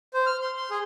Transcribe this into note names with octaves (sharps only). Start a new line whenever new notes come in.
C5
F6
C6
C6
G#4